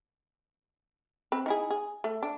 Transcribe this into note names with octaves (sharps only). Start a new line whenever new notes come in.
C4 B4
D#4 E4 G#4
G#4
A3
D4